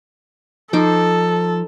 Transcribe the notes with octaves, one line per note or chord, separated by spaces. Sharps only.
F3 D#4 A4 C5 D6